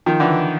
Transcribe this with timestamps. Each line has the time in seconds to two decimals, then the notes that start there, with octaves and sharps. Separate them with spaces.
0.06 D#3 F3
0.20 D3 E3